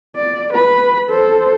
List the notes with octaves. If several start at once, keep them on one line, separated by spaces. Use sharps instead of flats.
D5
B4 B5
A4 C5